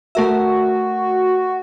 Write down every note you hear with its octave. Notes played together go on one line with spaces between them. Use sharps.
A3 F#4 A#4 E5